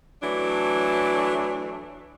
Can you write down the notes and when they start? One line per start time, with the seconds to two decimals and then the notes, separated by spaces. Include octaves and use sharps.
0.22 E3 F#3 A3 D4